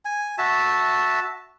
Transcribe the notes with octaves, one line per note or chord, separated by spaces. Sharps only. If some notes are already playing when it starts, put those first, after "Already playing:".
G#5
F#4 E5 A5